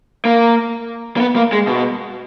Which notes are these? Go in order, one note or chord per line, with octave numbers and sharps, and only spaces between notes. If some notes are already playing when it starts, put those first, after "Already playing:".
A#3
A#3
B3
A#3
G#3
B2